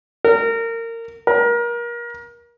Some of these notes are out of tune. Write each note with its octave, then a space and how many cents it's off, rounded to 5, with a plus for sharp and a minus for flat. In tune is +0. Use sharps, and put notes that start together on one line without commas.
A#4 -25
A#4 +30